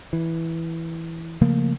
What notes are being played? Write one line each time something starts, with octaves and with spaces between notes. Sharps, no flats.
E3
C#3 F3 A3 A#3